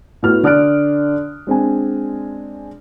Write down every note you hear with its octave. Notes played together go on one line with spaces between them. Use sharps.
A2 A3 B3 F#4 F6
D3 D5 D#6 F6 F#6 D7
G#3 C4 D4 G#5